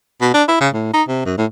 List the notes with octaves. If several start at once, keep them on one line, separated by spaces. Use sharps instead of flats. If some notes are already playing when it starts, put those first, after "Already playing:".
B2
D4
E4
C#3
A2
D#4
C3
F#2
A2